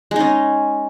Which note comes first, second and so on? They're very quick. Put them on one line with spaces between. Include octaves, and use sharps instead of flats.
G#3 D#4 C#4